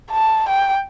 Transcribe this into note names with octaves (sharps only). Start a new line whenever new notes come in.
A5
G5